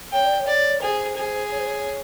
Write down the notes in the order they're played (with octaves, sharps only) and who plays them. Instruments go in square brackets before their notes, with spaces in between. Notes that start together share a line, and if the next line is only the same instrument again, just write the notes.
[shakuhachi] C#5 [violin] G5
[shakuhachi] D5
D5
C#5
[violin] D5
[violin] G#4 [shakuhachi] C5
[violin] G#4
[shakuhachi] C#5
C5
C#5